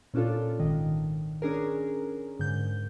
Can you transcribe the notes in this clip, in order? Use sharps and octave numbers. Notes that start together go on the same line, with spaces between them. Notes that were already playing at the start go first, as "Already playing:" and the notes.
A#2 C#4 D4 F4 A4
G#1 D#3
C#4 D4 G#4 A#4
G#2 D3 G6